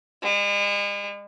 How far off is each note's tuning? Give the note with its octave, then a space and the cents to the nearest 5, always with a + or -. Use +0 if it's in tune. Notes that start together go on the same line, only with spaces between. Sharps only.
G#3 -40